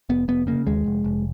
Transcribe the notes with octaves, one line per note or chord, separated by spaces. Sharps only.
F1 B3
F1 B3
C#3 A#3
D#2 G#3
F1
F1